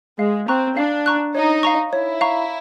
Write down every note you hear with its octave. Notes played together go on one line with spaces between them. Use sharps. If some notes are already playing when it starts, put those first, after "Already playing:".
G#3 F5
C4 A#5 C#6 F#6
D4 F5
A#5 C#6 F#6
D#4 C#5
F5 A#5 C#6
E4 C#5
F5 A#5 C#6